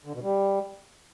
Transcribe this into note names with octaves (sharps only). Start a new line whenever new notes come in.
D3
B2
G3